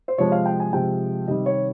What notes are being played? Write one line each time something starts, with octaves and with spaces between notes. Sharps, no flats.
C5
C3 F3 G#3 C#5
F5
G5
G#5
C3 F3 G#3 G5
C3 D#3 G3 D#5
C#5